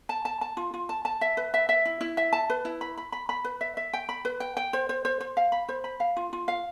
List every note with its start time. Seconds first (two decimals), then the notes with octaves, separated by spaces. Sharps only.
0.09 A5
0.25 A5
0.41 A5
0.57 F4
0.74 F4
0.89 A5
1.05 A5
1.21 E5
1.37 B4
1.54 E5
1.69 E5
1.85 E4
2.01 E4
2.17 E5
2.33 A5
2.50 B4
2.65 E4
2.81 B5
2.97 B5
3.12 B5
3.29 B5
3.45 B4
3.61 E5
3.77 E5
3.93 G5
4.09 B5
4.25 B4
4.40 G5
4.57 G5
4.73 C5
4.89 C5
5.05 C5
5.21 C5
5.37 F5
5.52 B5
5.69 C5
5.84 B5
6.00 F5
6.17 F4
6.33 F4
6.48 F5